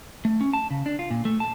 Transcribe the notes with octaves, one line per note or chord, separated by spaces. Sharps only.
A3
C#4
A5
C#3
D4
F4
A#2
A3
A5